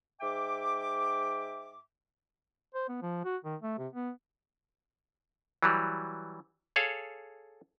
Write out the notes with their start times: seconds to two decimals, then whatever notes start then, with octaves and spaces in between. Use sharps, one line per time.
0.20 G#2 E5 G5 D6
2.74 C5
2.88 B3
3.02 F3
3.25 F#4
3.45 D#3
3.62 A3
3.78 C3
3.93 B3
5.63 E3 F#3 G3
6.76 G#4 A4 C#5 F5